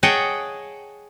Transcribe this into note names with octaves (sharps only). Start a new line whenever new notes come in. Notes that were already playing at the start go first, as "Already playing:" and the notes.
G#4 C#5 D#5 F#5 G5 A5